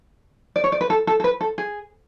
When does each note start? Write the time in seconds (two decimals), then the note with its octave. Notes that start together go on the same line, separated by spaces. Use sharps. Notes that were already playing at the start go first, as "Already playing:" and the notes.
0.56 D5
0.64 C#5
0.72 D5
0.81 B4
0.90 A4
1.07 A4
1.20 A4
1.24 B4
1.41 A4
1.58 G#4